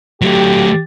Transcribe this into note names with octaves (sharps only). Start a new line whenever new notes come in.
F#3 A3 G4